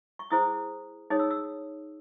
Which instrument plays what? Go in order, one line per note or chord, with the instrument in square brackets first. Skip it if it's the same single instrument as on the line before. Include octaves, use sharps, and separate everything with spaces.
[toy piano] C#6
E4 G#4 C5 D#6
D#4 G#4 C#5 D#6
E6
E6